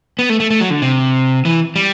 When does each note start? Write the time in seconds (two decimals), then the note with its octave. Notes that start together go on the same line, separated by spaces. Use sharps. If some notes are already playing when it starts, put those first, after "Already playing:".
0.19 B3
0.29 A3
0.40 A3
0.50 A3
0.60 F#3
0.70 D3
0.82 C3
1.45 E3
1.76 G3